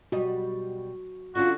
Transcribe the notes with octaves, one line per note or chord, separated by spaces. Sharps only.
B2 G3 F#4 D#5
D3 C#4 D4 F4 F#4